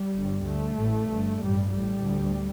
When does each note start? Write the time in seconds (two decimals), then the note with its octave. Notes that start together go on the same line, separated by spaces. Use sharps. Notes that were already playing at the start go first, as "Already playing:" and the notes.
Already playing: G3
0.15 G1 G2
0.46 D2 A3
0.77 A1 A2
1.09 G1 G2
1.41 A1 G2 G3
1.72 A1 A2 G3
2.03 D2